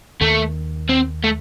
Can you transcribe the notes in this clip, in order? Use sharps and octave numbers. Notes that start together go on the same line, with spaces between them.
D#2 D#3 A3
C4
A3